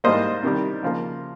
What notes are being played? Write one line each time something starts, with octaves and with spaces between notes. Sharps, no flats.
G#2 G3 A#3 C5 D#5
C3 D#3 G3
C#3 F3 A#3